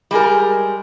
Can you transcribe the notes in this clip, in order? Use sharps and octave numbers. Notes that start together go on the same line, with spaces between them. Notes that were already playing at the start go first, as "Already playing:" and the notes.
G3 G#3 G#4 A#4